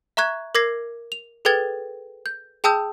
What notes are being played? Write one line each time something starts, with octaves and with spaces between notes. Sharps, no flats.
E5 A#5 C#6 F#6 G#6
A#4 D6 G#6 A#6 C7
F7
G#4 A4 B4 G5 G#6 A6
G6
G#4 G5 A5 D#6 E6 G6